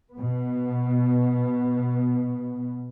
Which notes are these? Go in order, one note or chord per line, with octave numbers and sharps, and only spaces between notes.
B2 B3